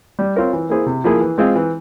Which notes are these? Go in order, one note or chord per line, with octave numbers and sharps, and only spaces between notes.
G3
C4 F4 A#4 C#5
E3
A#3 E4 G#4 C5
C3
F3 A#3 E4 G#4
E3
G#3 C4 F4 G#4
E3